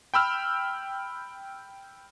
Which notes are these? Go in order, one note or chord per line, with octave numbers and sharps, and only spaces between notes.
G5 B5 E6 F6